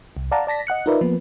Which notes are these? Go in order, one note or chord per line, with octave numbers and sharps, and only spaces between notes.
C2
D5 F5 F#5 A5 A#5
D5 A5 A#6 B6
D#5 F#5 F#6 C#7
D#4 F4 A#4 B4 D5 E5
F3 A#3 B3 B4